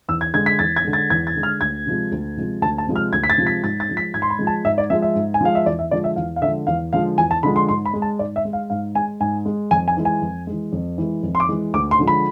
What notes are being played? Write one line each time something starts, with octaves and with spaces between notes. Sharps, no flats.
E2 E6
G#6
D3 G#3 G#6
B6
E2 A6
G#6
D3 G#3
A6
E2 G#6
A6
D3 G#3
F6
D2 G#6
C3 F3 G#3
D2
C3 F3 G#3
D2 A5
A5
C3 F3 G#3
F6
D2 G#6
B6
A6
C3 F3 G#3
B6
G#2 A6
A6
F3 G#3
B6
G#2 G#6
C6
B5
F3 G#3
A5
G#2 E5
D5
F3 G#3 E5
E5
G#2
G#5
F3 G#3 F5
E5
E2 D5
E5
D3 F3 G#3 D5
E5
E2 F5
F5
D3 F3 G#3 E5
E2 F5
D3 F3 G#3 F5
E2 G#5
A5
D3 F3 G#3 B5
C6
G#2 C6
B5
G#3
A5
G#2 D5
E5
G#3
F5
G#2 F5
G#3 G#5
G#2 G#5
G#3
F2 G#5
G#5
E3 G#3
G#5
F2
E3 G#3
F2
E3 G#3
F2
C6
D6
E3 G#3
D2 D6
C6
D3 F3 G#3
B5